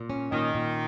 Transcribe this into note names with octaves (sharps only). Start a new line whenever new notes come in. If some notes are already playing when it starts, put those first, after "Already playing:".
Already playing: A#2
C#4
A#2 D#3
A#2